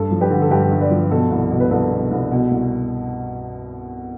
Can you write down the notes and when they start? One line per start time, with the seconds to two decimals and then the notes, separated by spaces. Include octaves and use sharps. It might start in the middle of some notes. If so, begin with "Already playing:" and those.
Already playing: G2 A4
0.11 F3
0.21 G4 B4
0.30 D3
0.42 A4
0.51 G2 G4 B4
0.71 G2
0.81 B4 D5
0.91 F3
1.10 B2 A4
1.31 C2
1.51 B2
1.60 B4
1.70 C2 A4
1.92 B2
2.11 C2
2.31 B2
2.51 C2